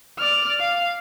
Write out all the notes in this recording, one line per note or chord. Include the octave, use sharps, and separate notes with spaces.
D5 F6
F5